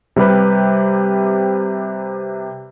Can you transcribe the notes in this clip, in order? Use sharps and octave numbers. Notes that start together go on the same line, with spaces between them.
C3 G3 G4 B4